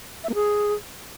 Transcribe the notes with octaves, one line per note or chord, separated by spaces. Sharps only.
E5
A#3
G#4